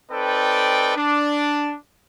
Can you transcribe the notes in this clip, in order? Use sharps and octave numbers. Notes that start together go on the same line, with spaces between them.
C4 D#4 A4 B4 D5 G5
D4